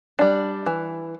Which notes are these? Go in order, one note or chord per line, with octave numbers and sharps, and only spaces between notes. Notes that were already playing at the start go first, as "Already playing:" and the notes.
G3 D4
E3